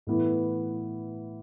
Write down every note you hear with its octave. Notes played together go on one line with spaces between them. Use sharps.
A2 E3 B3